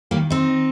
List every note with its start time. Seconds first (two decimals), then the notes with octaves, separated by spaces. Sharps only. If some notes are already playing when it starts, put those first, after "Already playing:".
0.11 D#3 G3 A#3
0.30 C4 D#4